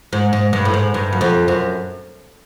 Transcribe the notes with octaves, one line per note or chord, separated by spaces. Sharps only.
G#2
G#2
G2
A2
G#2
G2
F#2
F2
F#2